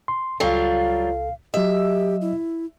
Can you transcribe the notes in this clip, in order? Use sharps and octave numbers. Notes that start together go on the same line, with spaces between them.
C6
C#2 F#3 G3 F4 A4 F5
F#3 G4 D#5 E5
E4